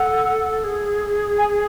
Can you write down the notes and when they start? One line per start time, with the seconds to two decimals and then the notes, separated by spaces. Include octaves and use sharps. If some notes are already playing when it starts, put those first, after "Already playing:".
Already playing: A4 F#5
0.64 G#4
1.38 G#5